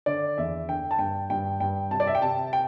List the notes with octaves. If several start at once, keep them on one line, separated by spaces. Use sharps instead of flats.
D3 D5
E2 E5
D3 G5
A5
G2 G5
G2 G5
G2 G5
C3 A5
D5
E5
G5
C3 A5
G5